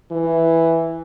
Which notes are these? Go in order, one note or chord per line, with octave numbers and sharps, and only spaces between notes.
E3